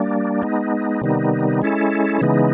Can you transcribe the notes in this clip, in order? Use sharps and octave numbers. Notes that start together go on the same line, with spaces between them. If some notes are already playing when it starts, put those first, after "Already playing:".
Already playing: G3 A#3 D4
G#3 B3 D#4
C3 D#3 G3 B3 D#4
G#3 C#4 E4 A4
C#3 E3 G#3 B3 D#4